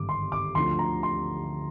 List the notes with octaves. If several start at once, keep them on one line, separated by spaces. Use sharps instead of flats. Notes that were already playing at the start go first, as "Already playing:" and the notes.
Already playing: G#1 G2 D3 D6
C6
D6
D2 D3 F3 C6
A#5
C6